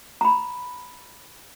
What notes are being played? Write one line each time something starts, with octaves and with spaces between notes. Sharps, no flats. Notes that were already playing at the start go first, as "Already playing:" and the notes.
A#5 B5